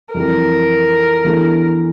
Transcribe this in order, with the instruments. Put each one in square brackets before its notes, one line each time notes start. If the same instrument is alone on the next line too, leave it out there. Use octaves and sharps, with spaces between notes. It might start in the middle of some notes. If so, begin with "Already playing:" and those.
[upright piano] F2 E3 G3 [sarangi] A#4
[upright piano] E2 E3 A3 D4 G4